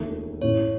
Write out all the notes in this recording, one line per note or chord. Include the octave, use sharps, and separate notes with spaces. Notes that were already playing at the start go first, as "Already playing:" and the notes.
Already playing: E1 D#2 D#3 A3 D#4
A1 A2 E3 C#5